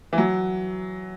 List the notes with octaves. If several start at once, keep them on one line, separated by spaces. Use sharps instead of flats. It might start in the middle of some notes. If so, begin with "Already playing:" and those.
E3
F#3